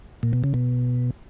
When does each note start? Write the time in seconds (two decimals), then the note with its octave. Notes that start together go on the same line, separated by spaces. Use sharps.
0.23 A#2
0.33 B2
0.44 C#3
0.54 B2